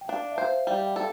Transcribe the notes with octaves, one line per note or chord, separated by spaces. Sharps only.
G5
D4 F5
E5
C5 F5
G3 F5
G5
A4